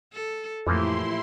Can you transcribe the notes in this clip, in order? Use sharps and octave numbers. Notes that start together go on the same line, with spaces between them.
A4
F2 A2 E3 F3 A#3 E4 G4 C6